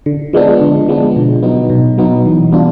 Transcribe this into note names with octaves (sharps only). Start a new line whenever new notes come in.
D3
F3 G#3 B3 D4
D3
F3 G#3 B3 D4
B2
F#3 B3 D#4
B2
F#3 B3 D#4
E3
G3 B3 D4 F4